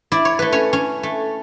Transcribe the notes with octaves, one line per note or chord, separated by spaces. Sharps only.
E4 D5
C#5
A3 B4
C#4 C#5
C#4
A3